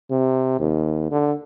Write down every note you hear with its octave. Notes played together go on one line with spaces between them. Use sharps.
C3
D#2
D3